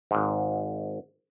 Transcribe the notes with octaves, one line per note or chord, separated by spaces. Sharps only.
G#1 G#2